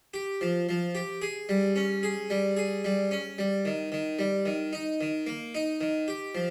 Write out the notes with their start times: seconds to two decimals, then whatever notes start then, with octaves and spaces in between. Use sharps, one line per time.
0.14 G4
0.41 F3
0.69 F3
0.95 G4
1.22 G#4
1.49 G3
1.76 C#4
2.03 G#4
2.30 G3
2.57 G#4
2.85 G3
3.11 C#4
3.38 G3
3.65 D#3
3.92 D#3
4.19 G3
4.46 D#3
4.73 D#4
5.01 D#3
5.27 A#3
5.55 D#4
5.81 D#3
6.08 G4
6.35 F3